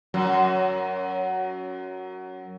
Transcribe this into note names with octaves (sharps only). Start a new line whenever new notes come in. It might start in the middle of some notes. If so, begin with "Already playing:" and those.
F#2 F#3